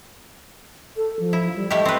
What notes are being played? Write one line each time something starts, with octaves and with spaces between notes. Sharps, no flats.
A4
F3
E4
G3
A3 E4 G4 D#5
C4 B4